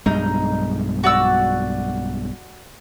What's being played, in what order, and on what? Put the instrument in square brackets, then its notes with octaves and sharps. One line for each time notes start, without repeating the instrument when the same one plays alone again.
[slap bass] B1 G2 G#3 [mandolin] D#4
[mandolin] F#4 D5 E6